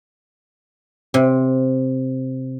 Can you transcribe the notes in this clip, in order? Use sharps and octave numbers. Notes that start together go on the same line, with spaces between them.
C3